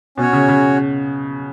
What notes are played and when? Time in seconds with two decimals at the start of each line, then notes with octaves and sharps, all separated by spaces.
0.17 B2 C#4
0.21 F#4 C#5
0.33 C#3
0.49 C#3